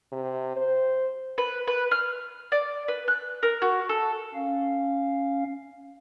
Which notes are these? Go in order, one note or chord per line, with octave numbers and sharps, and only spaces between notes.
C3
C5
B4
B4
F6
D5
B4
F#6
A#4
F#4
A4
C#4 F5